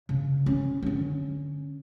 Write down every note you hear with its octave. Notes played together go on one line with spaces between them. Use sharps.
C#3
C#4
D3 C#4